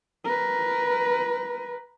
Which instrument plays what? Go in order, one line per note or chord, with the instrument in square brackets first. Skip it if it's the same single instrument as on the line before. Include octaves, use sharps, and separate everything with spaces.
[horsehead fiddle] A#4 B4